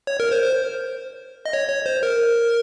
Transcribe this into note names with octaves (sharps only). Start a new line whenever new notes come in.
C#5
A#4
C5
C5
D#5
C#5
C#5
C5
A#4